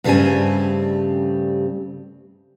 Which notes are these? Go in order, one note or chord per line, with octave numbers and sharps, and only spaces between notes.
G2 C#3 G3 A3 C4 G#5